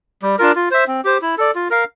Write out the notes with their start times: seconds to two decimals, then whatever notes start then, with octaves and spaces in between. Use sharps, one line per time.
0.22 G3
0.39 D4 F4 A#4
0.55 F4
0.71 C5 E5
0.88 C4
1.05 G4 C5
1.22 E4
1.38 A4 D5
1.55 F4
1.70 A#4 F5